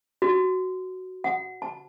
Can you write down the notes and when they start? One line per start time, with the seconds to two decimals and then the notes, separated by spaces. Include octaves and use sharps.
0.22 F#4
1.24 F#5
1.62 A5